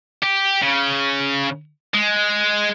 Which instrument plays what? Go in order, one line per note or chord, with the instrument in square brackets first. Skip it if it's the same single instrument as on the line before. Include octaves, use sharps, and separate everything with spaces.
[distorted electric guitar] G4
C#3
G#3